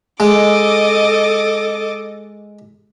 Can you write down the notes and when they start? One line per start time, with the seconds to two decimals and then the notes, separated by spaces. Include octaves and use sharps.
0.20 G#3 A4 D#5 D6